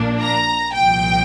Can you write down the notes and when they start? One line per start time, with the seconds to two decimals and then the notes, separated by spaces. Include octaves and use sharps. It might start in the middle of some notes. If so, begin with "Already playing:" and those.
Already playing: A#1 A#2 A#3 D4
0.21 A#5
0.74 C2 A#2 F3 G5